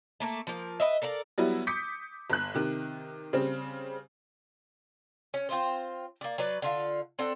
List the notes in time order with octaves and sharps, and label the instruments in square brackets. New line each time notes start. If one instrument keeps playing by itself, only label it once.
[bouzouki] A3 A#3 A5
F3 A#3
B4 D#5 E5
A4 A#4 D5 F5
[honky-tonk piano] F#3 G3 B3 E4
D6 D#6 G6 B6 C#7
G1 F#6
C3 D#3
C#3 G3 C4
[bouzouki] C#4
C4 F4 C5
A#3 D5
F#3 B4 D5
D3 F4 F5
C4 D4 A4 F#5